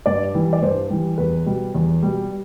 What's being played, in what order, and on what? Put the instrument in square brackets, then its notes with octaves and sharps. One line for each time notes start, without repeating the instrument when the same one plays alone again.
[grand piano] G2 D5
E3 G3
D5
G2 C5
E3 G3
E2 B4
B2 G3
E2
B2 G3